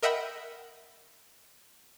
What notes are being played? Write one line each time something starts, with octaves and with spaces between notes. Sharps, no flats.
A#4 D#5 E5 F#5 G5 B5